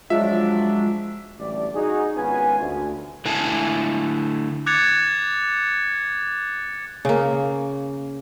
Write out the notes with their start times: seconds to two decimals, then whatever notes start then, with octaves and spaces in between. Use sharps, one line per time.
0.10 F3 F#3 G#3 D4 F4 E5
1.39 A1 D2 G3 A3 D5
1.74 D#4 F#4 G#4
2.16 G#1 B3 C#4 F4 B4 G#5
2.60 D2
3.25 D3 A3 E4 G#5 A5
4.66 D6 F#6 G#6 A6 C#7 F7
7.05 C#3 A#3